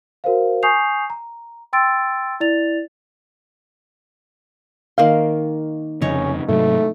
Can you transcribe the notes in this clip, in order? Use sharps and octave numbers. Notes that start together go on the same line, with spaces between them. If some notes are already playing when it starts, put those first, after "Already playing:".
F#4 A#4 C5 F5
G#5 C#6 D#6 G6 C7 F7
A#5
G5 C6 E6 A6 D7
E4 D5 A6 F7
D#3 A#3 F5 C6
F1 F2 C#3 C#4 D#4 C#5
G#2 C3 F#3 A3